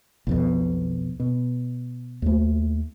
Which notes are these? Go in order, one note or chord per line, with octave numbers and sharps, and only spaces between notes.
B1 F2 B2
B2
D#2 A3